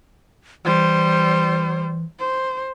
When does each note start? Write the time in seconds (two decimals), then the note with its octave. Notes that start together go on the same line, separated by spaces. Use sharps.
0.65 E3 G3 C5
2.19 C5